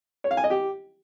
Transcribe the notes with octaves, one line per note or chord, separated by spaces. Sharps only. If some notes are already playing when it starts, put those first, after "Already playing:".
C#5
F5
G#5
D#5
G4